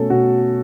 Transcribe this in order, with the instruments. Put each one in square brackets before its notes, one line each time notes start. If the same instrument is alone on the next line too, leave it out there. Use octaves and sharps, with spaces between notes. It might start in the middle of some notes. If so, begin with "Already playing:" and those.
Already playing: [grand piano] B2 A3 C#4 A4
B2 F#4